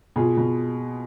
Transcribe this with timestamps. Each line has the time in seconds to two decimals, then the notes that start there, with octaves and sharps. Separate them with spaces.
0.16 B2 F4 G#4
0.37 B2